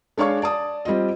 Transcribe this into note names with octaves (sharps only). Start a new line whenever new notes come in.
G#3 D4 C#5 F5 C#6 G#6
D5 A5 D#6
G3 C4 F4 D#5